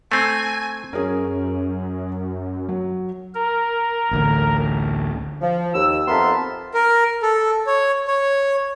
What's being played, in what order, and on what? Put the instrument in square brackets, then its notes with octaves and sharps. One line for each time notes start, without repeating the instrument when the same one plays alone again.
[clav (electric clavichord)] A3 C4 [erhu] G#5
[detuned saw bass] F#2 [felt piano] C#4 G#4 A#4
[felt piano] F#3
[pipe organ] A#4
[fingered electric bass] A1 D2 D3
[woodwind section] F3
D#2 E6
F2 B3 A#4 E5 A5 C6
[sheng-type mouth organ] A#4
A4
C#5
C#5